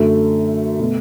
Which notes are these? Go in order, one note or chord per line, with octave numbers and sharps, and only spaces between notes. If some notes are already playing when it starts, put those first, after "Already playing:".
Already playing: F#2 D3 A3
B2 A3